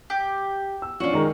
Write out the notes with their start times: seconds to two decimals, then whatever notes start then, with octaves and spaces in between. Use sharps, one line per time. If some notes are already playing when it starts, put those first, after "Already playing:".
0.10 G4
0.82 E6
1.00 F3 C#4 D4 F4 F#4
1.13 D#3 G#3 A#4